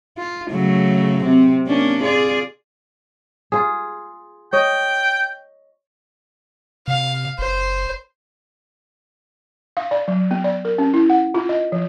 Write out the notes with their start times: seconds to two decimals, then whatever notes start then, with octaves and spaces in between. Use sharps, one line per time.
0.18 F4
0.51 C#3 F#3 A3
1.23 C3 C4
1.67 A#3 C#4 D4
2.02 F4 G#4 D5
3.52 F4 G#4
4.53 C#5 D#5 G5
6.88 C3 F5
7.39 F#1 C5
9.77 F5
9.91 D5
10.08 F#3
10.31 B3
10.44 D5
10.65 A#4
10.78 C#4
10.94 E4
11.10 F#5
11.34 F4
11.49 D#5
11.72 F3